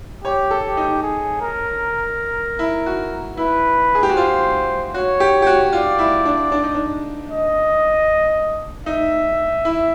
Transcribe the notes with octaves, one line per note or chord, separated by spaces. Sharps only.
G4 C#5
A4
G4
D#4
G#4
A#4
E4
F#4
E4 B4
G#4
G4
F#4
F4 C5
F#4 C#5
G4
G4
F#4
F4 D5
E4
D4
D4
D#4
D4
D#5
D#4 E5
E4